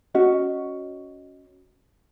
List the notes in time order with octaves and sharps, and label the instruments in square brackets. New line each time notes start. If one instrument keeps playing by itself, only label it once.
[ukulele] C#4 F#4 D#5